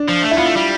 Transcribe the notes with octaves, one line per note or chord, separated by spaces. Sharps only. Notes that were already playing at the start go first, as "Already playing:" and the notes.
Already playing: D4
F3
A3
E4
B3 F4
A3
G3